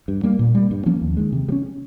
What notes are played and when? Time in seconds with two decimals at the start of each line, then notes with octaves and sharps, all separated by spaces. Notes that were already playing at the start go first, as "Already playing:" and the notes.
0.08 G2
0.23 G3 A#3
0.39 A#2
0.55 G3 A#3
0.71 G2
0.86 F3 A#3 C#4
1.01 D#2
1.17 D#3 G#3
1.32 C3
1.49 G3
1.52 C#4